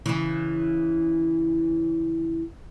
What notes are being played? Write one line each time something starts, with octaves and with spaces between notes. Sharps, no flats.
C#3 E3